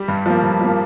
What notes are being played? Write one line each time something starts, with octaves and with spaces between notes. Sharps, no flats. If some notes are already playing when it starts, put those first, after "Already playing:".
Already playing: G3 G4
G2
F3 A#3
G2
F3 A#3